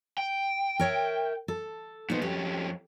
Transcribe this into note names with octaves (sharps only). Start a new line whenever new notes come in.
G5
A#4 C#5 E5
A4
A#2 B3 D#4 C5
F2 C#4 G4